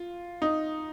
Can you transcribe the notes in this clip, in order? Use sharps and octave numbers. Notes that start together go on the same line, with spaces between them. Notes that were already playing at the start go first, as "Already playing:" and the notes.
Already playing: F4
D#4